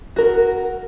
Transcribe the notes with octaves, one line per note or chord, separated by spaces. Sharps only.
F#4 A#4